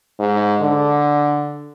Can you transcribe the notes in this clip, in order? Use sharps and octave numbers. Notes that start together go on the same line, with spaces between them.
G#2
D3